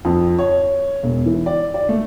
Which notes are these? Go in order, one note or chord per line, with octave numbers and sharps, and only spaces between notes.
F2
C#5
E1
E3
D5
D5
A3